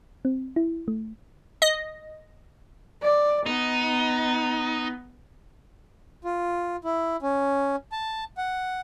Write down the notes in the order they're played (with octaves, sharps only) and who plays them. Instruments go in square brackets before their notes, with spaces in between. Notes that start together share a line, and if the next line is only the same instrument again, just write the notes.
[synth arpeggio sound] C4
E4
A3
D#5
[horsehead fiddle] D5
[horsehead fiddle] B3 [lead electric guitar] D#4
[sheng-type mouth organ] F4
E4
C#4
A5
F#5